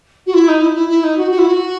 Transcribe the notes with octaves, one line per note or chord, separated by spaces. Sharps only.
F#4
E4
D#4
E4
D#4
E4
E4
D#4
F#4
F#4
E4
F#4